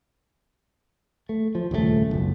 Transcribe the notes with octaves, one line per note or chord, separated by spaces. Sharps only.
A3
F3
D#1 C#2 C3 A3
F#1 B1